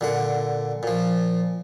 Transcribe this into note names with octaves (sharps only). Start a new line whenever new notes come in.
A#2 D3 F#5
A#2 F3